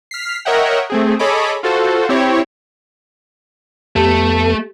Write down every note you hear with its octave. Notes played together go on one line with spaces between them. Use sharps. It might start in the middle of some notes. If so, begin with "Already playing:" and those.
F6 B6 C7
A#4 C#5 D#5 E5 F#5 G5
A3 C4 G#4
G#4 A4 C#5 D#5 B5 D6
F4 F#4 A4 C5
C4 E4 G4 C#5
F2 A3 B3 G4 A5